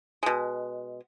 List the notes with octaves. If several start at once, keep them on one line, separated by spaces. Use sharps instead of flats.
B2 G#3